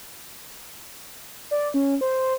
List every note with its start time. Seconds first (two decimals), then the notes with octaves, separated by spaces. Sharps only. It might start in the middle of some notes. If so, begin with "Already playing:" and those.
1.51 D5
1.74 C#4
2.01 C5